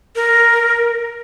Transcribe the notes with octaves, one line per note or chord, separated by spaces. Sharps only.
A#4